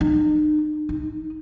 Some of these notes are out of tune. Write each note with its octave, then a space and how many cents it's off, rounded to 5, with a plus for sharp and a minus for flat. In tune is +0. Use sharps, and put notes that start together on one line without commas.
D#4 -40
D#4 +10